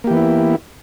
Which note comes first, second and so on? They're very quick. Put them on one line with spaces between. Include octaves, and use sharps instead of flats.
A#3 G4 E3 B3 E4